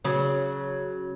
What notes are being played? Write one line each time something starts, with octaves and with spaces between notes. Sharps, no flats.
C#3 F#3